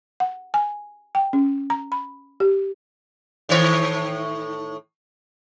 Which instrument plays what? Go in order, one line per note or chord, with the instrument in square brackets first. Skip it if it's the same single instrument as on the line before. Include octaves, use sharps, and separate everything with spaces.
[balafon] F#5
G#5
G5
C#4
A#5
B5
G4
[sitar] A2 D#3 C#5